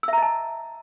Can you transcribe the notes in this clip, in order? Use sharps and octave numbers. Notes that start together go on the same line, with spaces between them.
D#5 E5 A5 A#5 E6